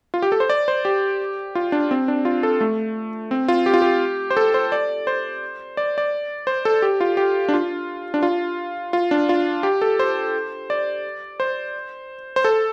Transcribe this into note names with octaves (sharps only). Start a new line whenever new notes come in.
F4
G4
A4
C5
D5
C5
G4
F4
D4
C4
D4
F4
A4
A3
C4
F4
G4
F4
G4
C5
A4
C5
D5
C5
D5
D5
C5
A4
G4
F4
G4
D4
F4
D4
F4
F4
D4
F4
G4
A4
C5
D5
C5
C5
A4